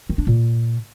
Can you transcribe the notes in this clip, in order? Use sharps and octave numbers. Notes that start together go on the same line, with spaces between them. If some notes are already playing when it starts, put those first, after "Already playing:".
D#3
D4
A#2